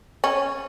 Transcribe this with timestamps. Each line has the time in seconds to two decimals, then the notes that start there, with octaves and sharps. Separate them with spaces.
0.24 C#4